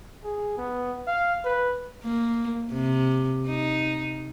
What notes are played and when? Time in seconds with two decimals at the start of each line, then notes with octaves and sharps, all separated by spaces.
0.24 G#4
0.57 B3
1.07 F5
1.45 B4
2.03 A#3
2.72 C3
3.48 D#4